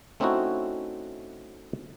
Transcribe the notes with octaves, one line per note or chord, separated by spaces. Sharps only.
A3 C4 C#4 D#4 E4 F#4